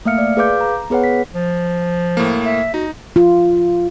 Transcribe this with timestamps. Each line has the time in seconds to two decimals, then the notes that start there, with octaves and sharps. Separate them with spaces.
0.05 A3 A#3 E5 F5 F6 C#7
0.18 D5
0.37 G#4 B4 F5 D6 G6
0.61 A#5
0.90 B3 G#4 B4 C#5 F#5
1.04 B6
1.34 F3
2.17 A2 A#3
2.46 E5
2.74 D#4 F#4
3.16 F4